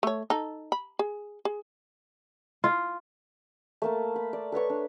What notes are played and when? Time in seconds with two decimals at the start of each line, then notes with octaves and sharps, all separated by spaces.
0.03 A3 C#5
0.30 D#4 A4
0.72 B5
0.99 G#4
1.45 G#4
2.64 F4
3.82 A3 A#3 A5
4.16 B5
4.33 D5
4.52 A4 B4 C#5 C#6
4.70 D4